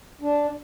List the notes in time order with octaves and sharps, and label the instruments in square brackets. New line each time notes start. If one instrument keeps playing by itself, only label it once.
[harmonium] D4